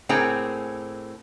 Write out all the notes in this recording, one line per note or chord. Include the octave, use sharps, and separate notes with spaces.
A2 A#3 C4 G#4 C#5 G5